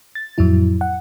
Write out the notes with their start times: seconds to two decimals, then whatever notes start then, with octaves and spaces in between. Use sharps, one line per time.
0.15 A6
0.38 F2 A2 F#3 E4
0.81 F#5